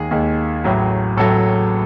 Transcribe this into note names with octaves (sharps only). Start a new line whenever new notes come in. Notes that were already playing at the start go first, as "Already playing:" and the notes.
Already playing: D#2 D#3 G#3 G#4
D#2 D#3 G#3
A1 A2 F#3
A1 A2 F#3 A4